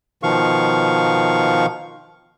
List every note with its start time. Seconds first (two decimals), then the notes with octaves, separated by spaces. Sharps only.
0.23 B2 D#3 F3 F5 C#6